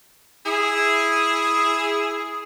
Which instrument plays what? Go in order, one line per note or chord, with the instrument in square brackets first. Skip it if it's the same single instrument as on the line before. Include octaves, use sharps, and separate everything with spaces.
[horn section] E4 G#4